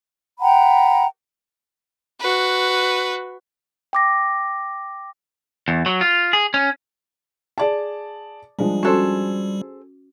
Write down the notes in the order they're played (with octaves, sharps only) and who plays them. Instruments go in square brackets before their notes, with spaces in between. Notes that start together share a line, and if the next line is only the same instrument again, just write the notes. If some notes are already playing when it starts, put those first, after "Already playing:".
[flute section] F#5 G5 A#5 B5
[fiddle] F#4 B4
[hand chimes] G5 D6 A#6
[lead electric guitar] E2
F#3
F4
G#4
C#4
[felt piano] G#4 D5 A5
[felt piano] F3 G#3 D4 [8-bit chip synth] G3
[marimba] C#4 F#4 [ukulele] G#4 A4 C5